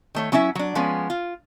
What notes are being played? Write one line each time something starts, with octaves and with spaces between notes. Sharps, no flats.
D#3 A3 C#5
F#3 C#4 D4 E4 E5
F#3 D4
F3 G#3 B3 C#4
F4